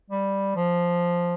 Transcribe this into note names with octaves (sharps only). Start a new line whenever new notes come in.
G3
F3